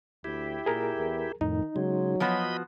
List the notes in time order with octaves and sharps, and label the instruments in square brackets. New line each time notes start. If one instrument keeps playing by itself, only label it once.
[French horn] D2 [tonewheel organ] E4 G4
[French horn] A#2 [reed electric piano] G#4 A#4
[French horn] E2
[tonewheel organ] F2 A2 [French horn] D#3 [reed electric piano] D#4
[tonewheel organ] C#3 G#3 [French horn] F#3
[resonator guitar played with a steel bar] F3 B3 F#4 [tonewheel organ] D#5 B5